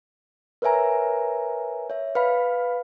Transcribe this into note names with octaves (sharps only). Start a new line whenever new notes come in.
A#4 B4 C#5 E5 G#5 A#5
C#5 E5
B4 F5 B5